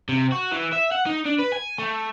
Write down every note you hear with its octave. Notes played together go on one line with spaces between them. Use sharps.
C3
F#4
E3
E5
F#5
D#4
D4
B4
G#5
A3